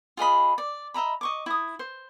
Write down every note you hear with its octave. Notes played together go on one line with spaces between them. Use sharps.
F4 G#4 D#5 B5
D5
D#5 E5 A#5 B5
D#5 C#6 D6
E4 D#6
C5